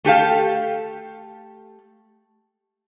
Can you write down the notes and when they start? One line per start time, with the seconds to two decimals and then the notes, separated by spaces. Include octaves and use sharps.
0.04 A3 G4 A4 F5